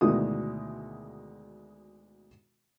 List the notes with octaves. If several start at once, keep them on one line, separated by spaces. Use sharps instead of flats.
D2 B2 D#3 G#3 E4 D#6